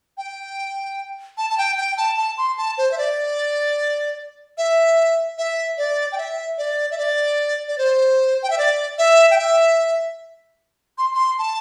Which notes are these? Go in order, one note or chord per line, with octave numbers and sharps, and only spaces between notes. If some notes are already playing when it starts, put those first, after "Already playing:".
G5
A5
A5
G5
G5
A5
A5
C6
A5
C5
E5
D5
E5
E5
D5
G5
E5
D5
E5
D5
D5
C5
G5
E5
D5
E5
G5
E5
C6
C6
A5